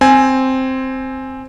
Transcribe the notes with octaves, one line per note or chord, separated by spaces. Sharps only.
C4 G#5